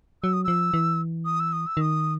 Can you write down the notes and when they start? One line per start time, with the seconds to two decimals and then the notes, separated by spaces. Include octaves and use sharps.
0.23 F#3 E6
0.33 D#6
0.44 F3 E6
0.74 E3
1.25 D#6
1.40 E6
1.53 D#6
1.67 E6
1.77 D#3 D#6